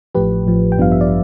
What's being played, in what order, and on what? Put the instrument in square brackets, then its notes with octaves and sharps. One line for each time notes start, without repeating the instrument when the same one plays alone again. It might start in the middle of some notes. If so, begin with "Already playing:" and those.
[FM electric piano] A1 A2 F3 G4 B4
A1 A2 F3
G5
A1 G2 F3 B3 D4 F5
E5
D5